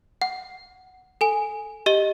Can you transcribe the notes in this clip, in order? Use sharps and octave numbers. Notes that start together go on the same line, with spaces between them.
F#5
A4 G#5
G4 D#5 G7